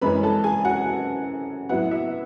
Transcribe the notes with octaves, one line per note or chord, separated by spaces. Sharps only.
F#2 E3 G#3 C#4 B4 B5
A4 A5
G#4 G#5
F#4 F#5
A2 F#3 B3 E4 F#4 F#5
E5